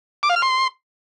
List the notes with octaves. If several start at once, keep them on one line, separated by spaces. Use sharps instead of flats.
D6
F5
F6
C6